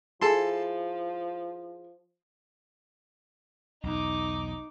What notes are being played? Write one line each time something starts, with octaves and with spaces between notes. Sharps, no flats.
F3 E4 G#4 A4 A5 C6
B1 E2 D#4 D6